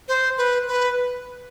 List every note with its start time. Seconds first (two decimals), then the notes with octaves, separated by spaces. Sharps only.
0.08 C5
0.38 B4
0.67 B4